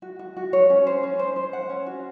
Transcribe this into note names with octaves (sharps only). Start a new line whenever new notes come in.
F#4
F#4
F#4
C#5
C#4
C5
C#4
C5
C5
F#5
C#4
F#4